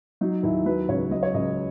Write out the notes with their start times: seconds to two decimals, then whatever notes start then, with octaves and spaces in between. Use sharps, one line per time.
0.21 F#3 D#4
0.43 D#2 E4
0.66 F#3 B4
0.89 C#2 C#5
1.11 F#3 D#5
1.23 C#5
1.34 C#2 D#5